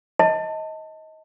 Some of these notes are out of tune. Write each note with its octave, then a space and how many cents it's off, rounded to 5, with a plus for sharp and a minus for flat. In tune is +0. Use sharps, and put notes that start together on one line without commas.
D#5 +25 A5 +20